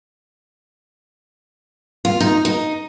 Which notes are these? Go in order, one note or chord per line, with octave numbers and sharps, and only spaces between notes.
F4
D#4
D#4